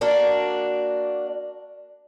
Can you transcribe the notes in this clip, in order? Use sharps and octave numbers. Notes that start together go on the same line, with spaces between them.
A#3 D4 F#4